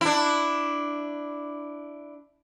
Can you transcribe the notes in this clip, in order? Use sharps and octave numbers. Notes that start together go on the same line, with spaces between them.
D4 E4